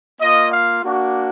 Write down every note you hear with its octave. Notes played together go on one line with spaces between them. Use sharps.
A#3 F4 D#5
F5
A#3 D4 F#4